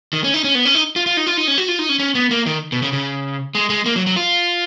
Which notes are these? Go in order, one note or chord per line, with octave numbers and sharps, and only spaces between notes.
D#3
C#4
D#4
C#4
B3
C#4
D#4
F4
F4
D#4
F4
D#4
C#4
F#4
F4
D#4
C#4
C#4
B3
A#3
D#3
B2
C#3
C#3
G#3
G#3
A#3
F#3
F#3
F4